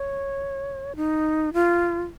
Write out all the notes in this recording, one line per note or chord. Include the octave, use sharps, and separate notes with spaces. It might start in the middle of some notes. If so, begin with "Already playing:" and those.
Already playing: C#5
D#4
F4